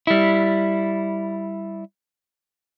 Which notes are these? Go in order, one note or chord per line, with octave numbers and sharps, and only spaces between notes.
G3 E4